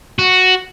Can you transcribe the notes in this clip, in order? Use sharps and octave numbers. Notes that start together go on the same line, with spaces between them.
F#4